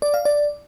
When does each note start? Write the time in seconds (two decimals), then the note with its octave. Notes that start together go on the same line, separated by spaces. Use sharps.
0.02 D5
0.14 F5
0.25 D5